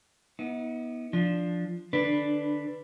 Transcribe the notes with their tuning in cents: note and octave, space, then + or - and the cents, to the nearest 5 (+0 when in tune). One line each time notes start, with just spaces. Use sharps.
B3 -20 D#4 +40
F3 +0 D4 -5
D3 +30 D4 +0 B4 +0